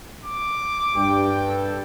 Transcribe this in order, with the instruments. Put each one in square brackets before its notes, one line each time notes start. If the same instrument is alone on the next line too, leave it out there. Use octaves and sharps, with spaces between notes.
[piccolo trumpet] D6
[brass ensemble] G2 G5
[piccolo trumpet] A4